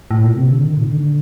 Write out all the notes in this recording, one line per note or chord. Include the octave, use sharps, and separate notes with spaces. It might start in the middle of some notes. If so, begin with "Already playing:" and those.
A2
A#2
C3
D3
D#3
A#2
D#3
D3